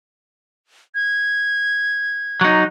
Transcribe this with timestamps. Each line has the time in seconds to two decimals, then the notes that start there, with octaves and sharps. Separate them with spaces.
0.95 G#6
2.41 F#3 D#4